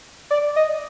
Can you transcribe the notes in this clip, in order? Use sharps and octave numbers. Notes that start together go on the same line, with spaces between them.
D5
D#5